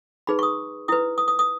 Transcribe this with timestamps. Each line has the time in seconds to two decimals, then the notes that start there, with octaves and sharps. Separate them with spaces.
0.27 D#4 G#4 B4 B5
0.39 C#6
0.43 D#6
0.88 E4 B4 D#6
1.18 D#6
1.28 D#6
1.39 D#6